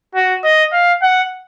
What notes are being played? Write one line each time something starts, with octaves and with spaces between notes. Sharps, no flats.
F#4
D#5
F5
F#5